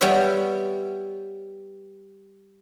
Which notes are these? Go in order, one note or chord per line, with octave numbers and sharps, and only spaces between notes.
G3 B3 B4 C#5 E5